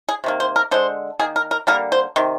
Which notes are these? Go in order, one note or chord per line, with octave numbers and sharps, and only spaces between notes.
G#4
C3 D#3 A#3
C5
A#4
D3 G#3 C5
D#3 A#3 G#4
A#4
A#4
D3 G3 A#3 A#4
C5
C3 D#3